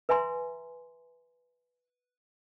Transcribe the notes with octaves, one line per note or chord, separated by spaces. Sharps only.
B4 E5 G#5 A#5 C6